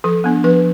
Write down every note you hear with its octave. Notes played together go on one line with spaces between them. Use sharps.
F3 A4
B3 D4
F3 B4